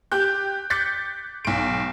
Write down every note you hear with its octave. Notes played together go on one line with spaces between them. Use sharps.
G4 F#6 G6
D6 F#6 G6 A6 B6 C#7
B1 D7